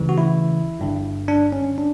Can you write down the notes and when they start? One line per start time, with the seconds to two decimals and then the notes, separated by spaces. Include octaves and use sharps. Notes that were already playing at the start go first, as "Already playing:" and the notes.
Already playing: D2 C#3 E3
0.09 F#4
0.18 E4
0.79 G1 G2 D3
1.28 D4
1.52 C#4
1.78 D4